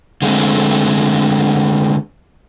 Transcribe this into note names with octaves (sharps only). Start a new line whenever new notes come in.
D3 G#3 A3 C4